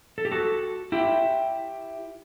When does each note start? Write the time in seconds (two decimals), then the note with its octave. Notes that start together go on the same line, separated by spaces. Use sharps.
0.18 A4
0.25 G4
0.32 F#4 A4
0.92 E4 G4